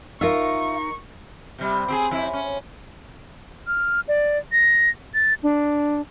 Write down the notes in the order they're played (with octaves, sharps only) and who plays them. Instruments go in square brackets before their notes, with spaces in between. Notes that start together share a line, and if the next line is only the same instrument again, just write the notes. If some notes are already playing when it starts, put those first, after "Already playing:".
[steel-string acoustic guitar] D#4 A#4 [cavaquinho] F4 E5 [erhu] C#6
[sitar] C3 G3
C4 G4 G#4
F2 E4
C#4
[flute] F6
D5
A#6
A6
D4